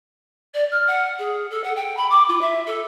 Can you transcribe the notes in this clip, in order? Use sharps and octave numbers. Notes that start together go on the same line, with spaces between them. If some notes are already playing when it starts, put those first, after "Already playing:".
D5
F6
F#5
G#4
A4
F#5
G5
B5
D6
F4
E5
A4